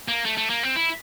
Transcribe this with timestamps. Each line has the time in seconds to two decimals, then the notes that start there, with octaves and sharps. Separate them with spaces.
0.08 A#3
0.26 A3
0.37 A3
0.50 A#3
0.63 C4
0.76 E4